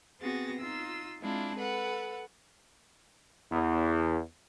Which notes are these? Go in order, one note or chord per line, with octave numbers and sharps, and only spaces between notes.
B3 C4 F#4 G#4 A6 A#6
D#4 F4 E6
G#3 C4 D4 E4 F4
A4 B4 F#5
E2